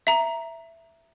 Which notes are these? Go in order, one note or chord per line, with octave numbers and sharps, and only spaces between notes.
E5 A#5